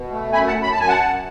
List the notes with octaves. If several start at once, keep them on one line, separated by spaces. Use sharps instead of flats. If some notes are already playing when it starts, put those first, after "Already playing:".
Already playing: B2
A3
F#2 G#5 B5
F#5 A5
F#2
B5
A5
F#2 G#5
F#5 A5
F#2